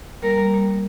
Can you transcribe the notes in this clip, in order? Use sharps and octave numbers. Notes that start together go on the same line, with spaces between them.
G3 A#3 A#4
G3 A#3
G3 A#3